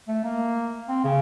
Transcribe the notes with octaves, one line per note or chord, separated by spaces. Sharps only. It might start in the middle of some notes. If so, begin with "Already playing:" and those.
A3
A#3
C4
C#3